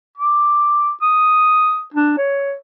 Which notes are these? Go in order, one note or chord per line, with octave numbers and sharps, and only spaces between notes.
D6
D#6
D4
C#5